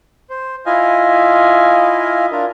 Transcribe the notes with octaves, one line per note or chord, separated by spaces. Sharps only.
C5
E4 F4 D#5 F5 G#5
D4 F4 A#4